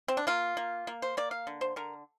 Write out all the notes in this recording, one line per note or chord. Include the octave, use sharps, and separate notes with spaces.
C4
D4
A#3 F4
A#3
A#3
C5
A#3 D5
F5
D3
C5
D3 A#4